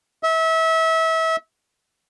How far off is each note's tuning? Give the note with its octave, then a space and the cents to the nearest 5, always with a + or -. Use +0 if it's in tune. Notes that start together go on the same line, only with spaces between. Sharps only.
E5 -30